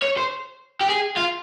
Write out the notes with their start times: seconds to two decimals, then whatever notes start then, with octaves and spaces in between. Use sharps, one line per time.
0.02 C#5
0.17 C5
0.81 G4
0.89 G#4
1.17 F4